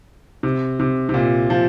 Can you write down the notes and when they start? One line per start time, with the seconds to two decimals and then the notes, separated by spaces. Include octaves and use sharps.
0.43 C3
0.80 C3
1.09 C3
1.14 A#2
1.50 F3